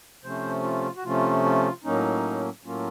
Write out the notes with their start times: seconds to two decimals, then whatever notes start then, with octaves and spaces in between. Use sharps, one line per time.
0.23 C3 F3 A3 C#4 C5
0.63 F4
0.96 F#4
1.04 C3 F3 A3 C#4 F4
1.45 F4
1.84 A2 F#3 A#3 C#4 D#4
2.65 A2 F#3 A#3 C#4 F4